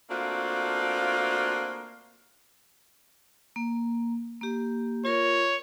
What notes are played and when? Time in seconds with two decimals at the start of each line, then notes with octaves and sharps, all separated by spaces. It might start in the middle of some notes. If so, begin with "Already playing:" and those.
0.11 A3 A#3 C4 D4 F4 F#4
3.56 A#3
4.41 A#3 G4
5.05 F4 A#4 C#5